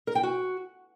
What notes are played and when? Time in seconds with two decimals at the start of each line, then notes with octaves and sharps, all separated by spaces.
0.07 A#4
0.15 G5
0.23 F#4